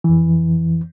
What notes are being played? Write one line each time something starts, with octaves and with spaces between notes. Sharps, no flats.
F2 E3